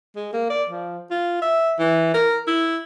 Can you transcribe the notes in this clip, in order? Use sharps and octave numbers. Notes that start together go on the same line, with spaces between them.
G#3
A#3
D5
F3
F4
E5
E3
A#4
E4